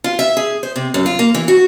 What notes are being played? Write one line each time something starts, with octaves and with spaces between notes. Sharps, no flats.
F4
E5
G#4
C5
C3
F#2
F4
A#3
E3
F#4